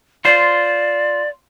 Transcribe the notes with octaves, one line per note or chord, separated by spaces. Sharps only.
F4 C5 D5